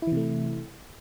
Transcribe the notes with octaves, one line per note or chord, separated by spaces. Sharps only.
C3 E3 A3 E4